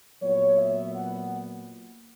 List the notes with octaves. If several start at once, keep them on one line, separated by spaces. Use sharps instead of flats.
A#2 F#3 B3 C#5
E5
F#5